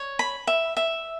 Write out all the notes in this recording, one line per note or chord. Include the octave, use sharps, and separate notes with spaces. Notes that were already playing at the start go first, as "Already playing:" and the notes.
Already playing: C#5
B5
E5
E5